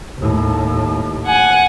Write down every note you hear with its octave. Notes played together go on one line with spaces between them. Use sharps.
D#2 A2
F#5 G#5